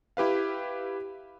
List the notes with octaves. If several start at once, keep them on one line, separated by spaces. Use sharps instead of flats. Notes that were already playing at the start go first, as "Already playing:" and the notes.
E4 G4 B4 F5